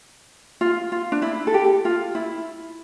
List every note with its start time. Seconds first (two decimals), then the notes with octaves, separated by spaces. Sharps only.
0.61 F4
0.92 F4
1.12 D4
1.22 E4
1.47 A4
1.54 G4
1.85 F4
2.15 E4